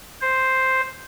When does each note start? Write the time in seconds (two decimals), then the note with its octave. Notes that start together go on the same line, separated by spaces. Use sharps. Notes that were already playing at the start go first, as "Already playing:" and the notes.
0.21 C5